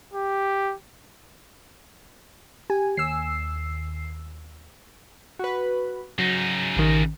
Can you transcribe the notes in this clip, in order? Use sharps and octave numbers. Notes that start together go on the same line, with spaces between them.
G4
G4 G#5
D#2 E6 C7
F#4 B4
C#3 F#3 D#4
A1 D#3